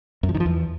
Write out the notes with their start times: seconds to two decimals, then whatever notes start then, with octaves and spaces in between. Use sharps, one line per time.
0.23 F#2
0.29 F3
0.34 D#3
0.40 F3
0.46 E2